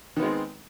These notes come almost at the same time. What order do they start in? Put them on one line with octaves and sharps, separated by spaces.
D#3 B3 G#3 C4